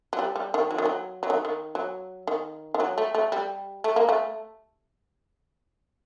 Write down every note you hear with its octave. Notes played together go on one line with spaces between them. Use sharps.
F#3
G3
G3
D#3
F#3
D#3
F#3
F#3
D#3
D#3
F#3
D#3
D#3
F#3
A3
A3
G3
A3
A#3
A3